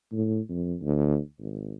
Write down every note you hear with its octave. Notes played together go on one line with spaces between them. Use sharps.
A2
F2
D2
G#1